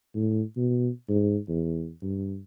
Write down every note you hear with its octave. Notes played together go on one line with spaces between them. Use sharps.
A2
B2
G#2
E2
G2